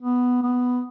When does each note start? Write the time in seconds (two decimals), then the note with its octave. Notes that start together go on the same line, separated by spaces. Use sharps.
0.01 B3
0.42 B3